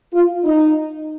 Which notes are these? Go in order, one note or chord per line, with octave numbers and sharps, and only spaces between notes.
F4
D#4